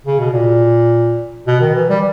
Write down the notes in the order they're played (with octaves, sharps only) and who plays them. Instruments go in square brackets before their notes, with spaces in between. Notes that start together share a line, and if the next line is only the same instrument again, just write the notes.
[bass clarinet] C#3
B2
A#2
B2
D#3
E3
G3